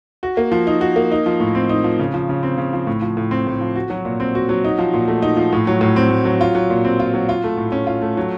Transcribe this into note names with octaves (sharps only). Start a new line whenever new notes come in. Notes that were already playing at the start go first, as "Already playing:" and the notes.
F#4
A#3
F3
D#4
F#4
A#3
D#4
F3
A2
C4
D#4
F3
C#3
F3
C#3
C4
C#3
F3
A2
F3
A2
C4
A2
F3
F#4
F#3
A#2
C4
F#4
F#3
D#4
F3
A#2
A3
D#4
F3
A2
F#3
A2
C4
A2
F#3
F4
F#3
A#2
C4
F4
F#3
F4
A3
A2
C#4
F4
A3
F#3